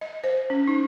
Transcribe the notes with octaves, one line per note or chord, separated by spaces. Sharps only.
D#5
C5
C#4
D#4